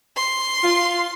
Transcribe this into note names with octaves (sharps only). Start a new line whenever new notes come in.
C6
F4